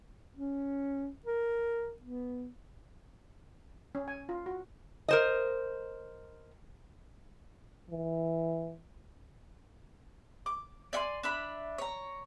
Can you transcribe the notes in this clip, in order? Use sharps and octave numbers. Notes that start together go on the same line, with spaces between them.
C#4
A#4
B3
C#4
G#5
F4
F#4
A#4 C5 D#5
E3
D6
D5 E5 G#5 C6
D4 E5 B5
C#5 A#5